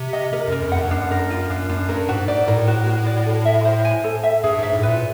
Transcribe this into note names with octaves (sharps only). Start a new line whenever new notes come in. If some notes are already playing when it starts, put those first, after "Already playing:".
Already playing: C3
D#5
C3 A#4
F#2 A#4
F2
F#5
F#2
G2
F#2 D4
A#4
F4
F#2 D4
F#2 D4
G2 A#4
G#2 F#4
G#2 D5
A2 A#4
F#4
F#4
D5
A4
E5
C5
G#5
A4
E5
G2 G#4
G#2 E5
A2
B4
A#2